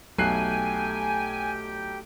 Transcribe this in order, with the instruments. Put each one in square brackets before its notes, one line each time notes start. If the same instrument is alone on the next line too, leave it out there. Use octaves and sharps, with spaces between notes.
[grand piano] B1 F#6 C7 [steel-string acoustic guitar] A3 [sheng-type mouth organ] G4 G5 [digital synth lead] G#5